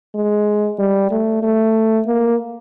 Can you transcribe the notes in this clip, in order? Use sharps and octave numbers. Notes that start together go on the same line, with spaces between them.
G#3
G3
A3
A3
A#3